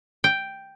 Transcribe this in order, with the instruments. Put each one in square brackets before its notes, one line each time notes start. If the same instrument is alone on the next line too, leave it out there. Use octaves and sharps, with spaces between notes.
[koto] G5